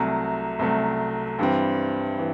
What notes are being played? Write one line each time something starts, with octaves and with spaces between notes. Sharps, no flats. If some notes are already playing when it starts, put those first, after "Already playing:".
Already playing: C2 C3 F#3 A3
C2 C3 F#3 A3
G2 E3 G3 C4
E3